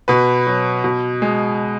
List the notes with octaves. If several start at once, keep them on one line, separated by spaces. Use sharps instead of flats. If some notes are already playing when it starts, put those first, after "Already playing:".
B2 B4
F#3
B2
G#3